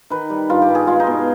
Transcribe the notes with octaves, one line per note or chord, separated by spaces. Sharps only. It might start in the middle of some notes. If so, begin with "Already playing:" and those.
D#3 B4
G3
G2 F4
G4
G2
G#4
G#3 F4
D#4
B2